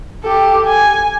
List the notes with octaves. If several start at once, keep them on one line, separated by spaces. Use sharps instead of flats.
G4 A4
G#5